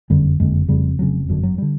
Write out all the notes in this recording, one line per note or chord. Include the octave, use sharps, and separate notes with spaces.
F#1 F2 D3 G3
F#1 F2 D3 G#3
F1 F2 C#3 G3
F1 F2 C#3 F#3
G1 F#2 D3
F#3
D3 G3